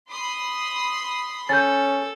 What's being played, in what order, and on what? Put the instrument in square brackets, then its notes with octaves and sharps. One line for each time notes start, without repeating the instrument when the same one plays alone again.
[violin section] B5 C6 D#6
[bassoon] C#4 [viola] A4 [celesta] G6 A6